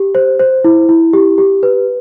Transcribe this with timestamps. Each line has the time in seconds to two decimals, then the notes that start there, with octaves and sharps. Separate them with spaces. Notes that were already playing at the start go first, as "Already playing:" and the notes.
Already playing: G4
0.15 C5
0.40 C5
0.64 E4
0.89 E4
1.13 G4
1.38 G4
1.63 B4